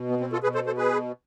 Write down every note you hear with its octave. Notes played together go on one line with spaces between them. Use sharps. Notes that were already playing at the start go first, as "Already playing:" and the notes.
Already playing: B2
B3
C4
F4 A4
B2 G#4 B4
A4 C5
A4 C5
G#4 B4